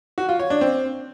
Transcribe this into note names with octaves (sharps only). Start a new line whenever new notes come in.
F#4
F4
C#5
D4
C4